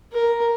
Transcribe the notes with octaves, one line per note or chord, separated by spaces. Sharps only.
A#4